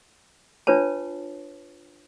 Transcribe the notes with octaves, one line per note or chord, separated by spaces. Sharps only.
D4 F4 B4 C#5 A5